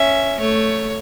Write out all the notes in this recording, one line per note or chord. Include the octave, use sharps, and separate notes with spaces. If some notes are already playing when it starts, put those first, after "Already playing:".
Already playing: C#4 E5
A3 C#5